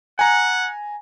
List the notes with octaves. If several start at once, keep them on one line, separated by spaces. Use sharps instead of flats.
F#5 G#5 A#5